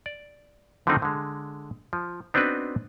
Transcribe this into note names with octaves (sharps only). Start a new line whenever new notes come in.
D5
D3 D#3 F3 A3 C4 D#4
D3 G#3
F3
B3 C4 D4 D#4 F#4 B4